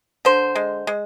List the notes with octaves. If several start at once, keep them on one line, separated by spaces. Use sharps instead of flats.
D3 C5
G#3
G#3